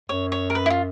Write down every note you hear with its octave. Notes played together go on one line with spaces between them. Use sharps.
F#2 C#5
C#5
A#4
B4
E4
F4